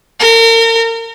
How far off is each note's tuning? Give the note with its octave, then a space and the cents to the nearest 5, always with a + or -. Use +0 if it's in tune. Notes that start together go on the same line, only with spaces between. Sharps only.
A#4 -35